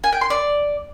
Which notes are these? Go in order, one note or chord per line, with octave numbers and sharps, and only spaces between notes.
G#5
G5
C6
D5